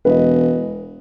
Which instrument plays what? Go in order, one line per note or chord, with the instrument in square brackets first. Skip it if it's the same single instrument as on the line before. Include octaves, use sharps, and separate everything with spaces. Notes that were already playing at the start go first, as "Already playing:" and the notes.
[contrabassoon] E1 [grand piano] B4 D#5